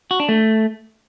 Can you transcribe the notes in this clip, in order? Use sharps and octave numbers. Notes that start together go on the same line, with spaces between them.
F#4
D4
A3